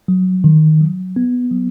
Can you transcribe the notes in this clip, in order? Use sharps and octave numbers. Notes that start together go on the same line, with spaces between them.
F#3
D#3
F#3
B3
F#3